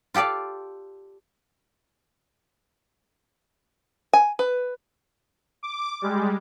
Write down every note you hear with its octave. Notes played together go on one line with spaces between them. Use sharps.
F4 G4 A4 D5 F5
G#5
B4
D6
G3 G#3